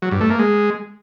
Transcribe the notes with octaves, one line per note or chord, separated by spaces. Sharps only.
F#3
G2
A3
A#3
G#3